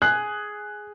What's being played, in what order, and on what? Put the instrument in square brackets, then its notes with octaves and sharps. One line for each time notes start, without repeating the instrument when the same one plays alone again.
[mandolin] G#4 [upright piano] F#6